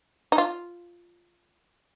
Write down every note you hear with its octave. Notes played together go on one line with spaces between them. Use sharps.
D#4
F4